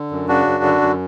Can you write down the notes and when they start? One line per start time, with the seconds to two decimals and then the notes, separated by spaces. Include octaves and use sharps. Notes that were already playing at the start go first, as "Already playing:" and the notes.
Already playing: D3
0.11 F#2
0.28 C#3 D4 F#4
0.46 F#2
0.64 D3
0.82 F#2